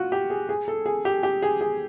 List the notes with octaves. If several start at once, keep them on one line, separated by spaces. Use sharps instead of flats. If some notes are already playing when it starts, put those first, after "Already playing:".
Already playing: F4 F#4
G4
G#4
G#4
A4
G#4
G4
G4
G#4
G#4